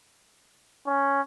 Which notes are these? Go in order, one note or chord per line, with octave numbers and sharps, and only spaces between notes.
C#4